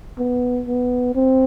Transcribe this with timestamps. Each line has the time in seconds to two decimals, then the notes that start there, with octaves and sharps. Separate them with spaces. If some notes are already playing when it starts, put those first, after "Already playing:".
0.18 B3
0.67 B3
1.15 C4